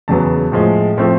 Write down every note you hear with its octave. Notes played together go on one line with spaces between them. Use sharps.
E2 C#3 F#3 B3 A5
A2 F3 G#3
A2 F3 A3 C4